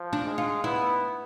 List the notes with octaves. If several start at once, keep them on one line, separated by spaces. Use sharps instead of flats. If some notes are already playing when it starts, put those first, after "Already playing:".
Already playing: F3
D4
G#3
F4
B3 E4